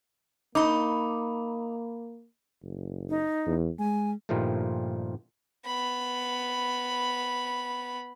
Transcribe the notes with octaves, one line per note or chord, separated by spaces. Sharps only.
A#3 D#4 B5 D6
F#1
D#4
E2
G#3 G#5
G2 A#2 D#3 F3 G3 A3
B3 B5